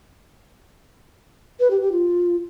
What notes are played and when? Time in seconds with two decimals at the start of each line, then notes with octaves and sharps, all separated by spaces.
1.60 B4
1.70 G4
1.81 G4
1.92 F4